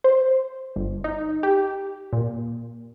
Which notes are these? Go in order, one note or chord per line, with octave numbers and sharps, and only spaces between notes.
C5
G1
D#4
G4
A#2